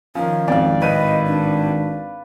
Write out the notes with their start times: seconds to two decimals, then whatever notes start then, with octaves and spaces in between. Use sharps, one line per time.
0.15 D#3 F3 C#4
0.48 G#1 F2 D5 F5
0.82 A2 B4 D#5 B5 D#7
1.26 D4